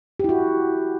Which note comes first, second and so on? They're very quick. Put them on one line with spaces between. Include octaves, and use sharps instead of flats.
G4 E4 F#4